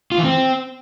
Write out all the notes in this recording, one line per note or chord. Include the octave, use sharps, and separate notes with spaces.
F4
E3
C4